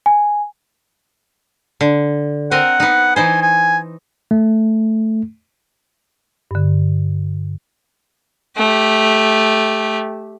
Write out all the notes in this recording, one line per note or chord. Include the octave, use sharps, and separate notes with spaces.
G#5
D3
C4 A#4 D#5 F#5
B3 D#4
E3 D#4 C5 G#5
G#5
A3
G2 D3
A3 G4